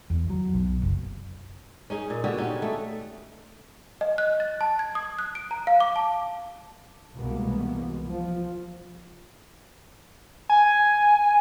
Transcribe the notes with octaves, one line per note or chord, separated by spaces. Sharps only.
E2
F#3
B1
F#1
C#4 D#4 G#4
A#2
D3 B3 F#4 G4
C#4 D#4
A3
D#5
F#6
A6
A5
G#6
D#6
F#6
D7
A#5
F5
D6
A5
C2 B2 E3 G#3 A#3 B3
F3
G#5